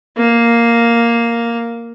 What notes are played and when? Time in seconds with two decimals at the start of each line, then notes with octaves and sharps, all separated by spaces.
0.17 A#3